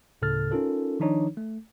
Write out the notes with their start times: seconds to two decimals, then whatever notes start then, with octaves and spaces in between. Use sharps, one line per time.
0.22 D2 A2 C#3 A4 F6 A6
0.51 C#4 D#4 F4 A4 A#4
1.00 D#3 F3 D4 D#4 C#5
1.37 A3